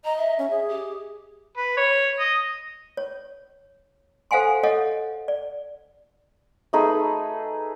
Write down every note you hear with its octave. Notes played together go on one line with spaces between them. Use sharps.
D#5 A#5
E5
C#4
G#4
G4
B4
C#5
D#5
C#5
A4 C5 F5 F#5 G#5 C6
A4 C#5 D#5 F5 F#5
D5
A3 D#4 G#4 B4